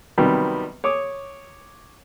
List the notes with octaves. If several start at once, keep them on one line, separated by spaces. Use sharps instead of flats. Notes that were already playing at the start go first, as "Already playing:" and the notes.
C3 D#3 F#3 G3 B3
C#5 D6 D#6